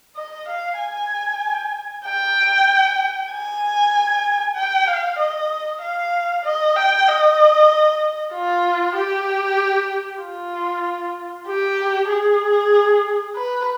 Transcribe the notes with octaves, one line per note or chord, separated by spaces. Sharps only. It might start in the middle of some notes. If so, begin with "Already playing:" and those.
D#5
F5
G#5
G5
G#5
G5
F5
D#5
F5
D#5
G5
D#5
F4
G4
F4
G4
G#4
B4